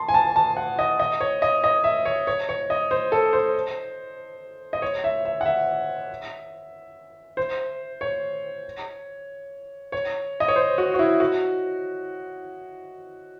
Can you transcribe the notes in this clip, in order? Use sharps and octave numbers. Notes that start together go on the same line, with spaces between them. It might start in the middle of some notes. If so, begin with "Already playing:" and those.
Already playing: A5 C6
G#5
A5
A5
F#5
D#5
D#5
C#5
D#5
D#5
E5
C#5
C#5
C#5
D#5
C5
A4
C5
D#5
C#5
E5
E5
F#5
E5
C5
C#5
C#5
D#5
C#5
C5
F#4
F#4
E4
F#4